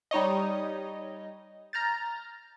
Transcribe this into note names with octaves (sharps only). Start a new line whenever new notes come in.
G3 D#4 C#5 D#5
A#5 F6 G6 A6